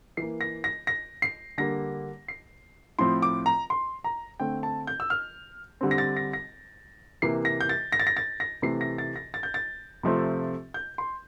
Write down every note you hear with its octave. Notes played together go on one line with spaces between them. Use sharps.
E3 A#3 C7
A#6
A#6
A#6
C7
D3 G3 A#3 A#6
C7
A2 F3 C4 C6
D6
A#5
C6
A#5
D3 A3 C4 G5
A5
G6
E6
F6
D3 G3 C4
A#6
A6
A#6
A#6
C3 E3 A#3 C7
A#6
G6
A6
A#6
A6
A#6
A6
A#6
C3 E3 A3 C4 C7
A#6
A6
A#6
A6
G6
A6
C3 F3 A3 C4
G6
C6